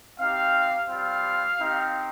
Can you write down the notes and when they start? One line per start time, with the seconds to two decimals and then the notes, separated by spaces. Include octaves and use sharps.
0.18 C4 D#4 G4 F5
0.89 G3 C4 F4 F5
1.59 C4 D#4 G4